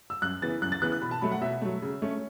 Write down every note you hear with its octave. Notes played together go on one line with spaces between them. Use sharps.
E6
F#2 F#6
C#3 E3 B3 A6
F#2 F#6
A6
C#3 E3 B3 F#6
F#6
B2 B5
A5
F#3 A3 B5
F#5
B2 E5
F#3 A3
C#3
A3 C#4